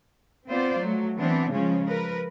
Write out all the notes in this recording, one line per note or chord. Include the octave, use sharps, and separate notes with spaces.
B3 C4 F4 C5 D5
F#3 A3
E3 B3 C4 D4
C#3 F3 G#3 C#4
F3 A#4 B4